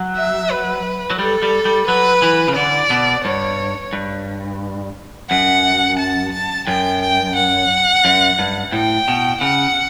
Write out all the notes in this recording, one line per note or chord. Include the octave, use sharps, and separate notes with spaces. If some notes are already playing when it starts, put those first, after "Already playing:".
Already playing: F#3
E5
B4
F#3
G3 A4
G3
G3
F#3 B4
E3
C#3
D3 D5
B2
G2 C#5
G2
F#2 F#5
A5
A5
F#2 G5
G5
F#5
F#2
G2
A2 G5
B2
C#3 F#5